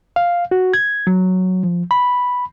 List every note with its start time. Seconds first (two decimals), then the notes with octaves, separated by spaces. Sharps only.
0.16 F5
0.51 F#4
0.74 G#6
1.07 F#3
1.63 F3
1.91 B5